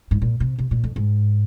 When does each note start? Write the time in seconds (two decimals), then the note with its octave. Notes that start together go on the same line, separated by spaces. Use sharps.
0.11 G#2
0.22 A#2
0.40 C3
0.58 C3
0.71 A#2
0.84 F2
0.96 G#2